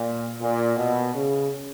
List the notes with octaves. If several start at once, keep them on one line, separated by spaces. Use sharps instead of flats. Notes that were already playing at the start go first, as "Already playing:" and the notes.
Already playing: A#2
A#2
B2
C#3